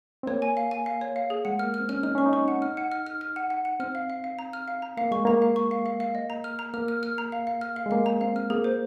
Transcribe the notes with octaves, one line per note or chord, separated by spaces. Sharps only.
C4
A#3 C#5
G#5
F5
G#5
F5
C#5
F5
G#4
G#3 F#5
A#3 F6
F6
C4
C#4 F6
D#4 F6
C#4 C#6
D#4
C#6
F#5
F6
F#5
F6
F6
F6
F#5
F#5
F#5
C4 F6
F5
F5
F5
A#5
F6
F5
A#5
A#3 F5
G#3 C#6
A#3 A#5
F5
C#6
F5
F5
F5
D#5
A#5
F6
A#5
A#3 F6
F6
F6
A#5
F5
F5
F6
F5
G#3
A#3 F5
A#5
C4 F5
F6
A#3 G#4
C5